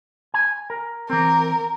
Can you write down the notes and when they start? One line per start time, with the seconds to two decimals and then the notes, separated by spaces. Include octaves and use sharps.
0.34 G#5
0.70 A#4
1.10 E3 C4 A#4